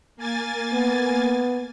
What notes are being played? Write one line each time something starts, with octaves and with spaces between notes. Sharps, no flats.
A#3 G#5 A6
B3